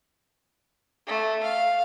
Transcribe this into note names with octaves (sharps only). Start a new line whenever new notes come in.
A3
F5